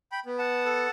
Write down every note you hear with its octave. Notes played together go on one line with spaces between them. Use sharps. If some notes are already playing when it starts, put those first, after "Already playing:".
G5 B5
B3
F#5 A5
A4